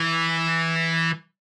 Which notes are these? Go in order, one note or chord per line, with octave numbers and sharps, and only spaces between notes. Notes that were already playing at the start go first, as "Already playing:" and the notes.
Already playing: E3